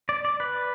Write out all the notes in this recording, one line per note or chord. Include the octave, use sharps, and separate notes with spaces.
D5
D5
B4